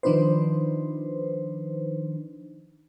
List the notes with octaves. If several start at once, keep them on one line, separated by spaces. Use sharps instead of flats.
D#3 F3 D4 D#4 B4 C5